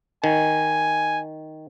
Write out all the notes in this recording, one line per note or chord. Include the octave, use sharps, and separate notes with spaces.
D#3 G#5